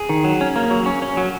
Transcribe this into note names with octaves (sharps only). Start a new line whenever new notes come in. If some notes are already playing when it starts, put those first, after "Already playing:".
Already playing: G#4
D#3
F#3
C#4
A#3
F#3
C#4
C#4
F#3